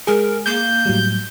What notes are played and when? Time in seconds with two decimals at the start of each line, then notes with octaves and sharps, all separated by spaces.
0.07 G#3 G#4 A#4
0.46 A#3 G6
0.86 A2 F#3 G3